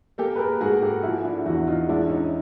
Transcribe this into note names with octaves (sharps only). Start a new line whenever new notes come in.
A#3 G4 A4
B4
G#4 A#4
G#2 F#4 G#4
G4 A4
F3 E4 F#4
D4 E4
E2 E4 F#4
D#4 F4
G#3 D4 E4
C#4 D#4